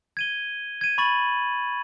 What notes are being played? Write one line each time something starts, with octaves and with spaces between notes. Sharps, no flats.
G#6 D#7 G7
G#6 D#7
B5 C#6 A6 F#7